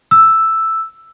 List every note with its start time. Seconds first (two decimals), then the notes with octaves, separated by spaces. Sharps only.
0.11 E6